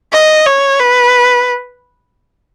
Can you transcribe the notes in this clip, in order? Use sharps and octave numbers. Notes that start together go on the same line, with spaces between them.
D#5
C#5
B4